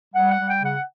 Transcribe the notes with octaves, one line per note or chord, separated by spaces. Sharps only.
G3 F#5
F#5
G3
G5
C#3
F#5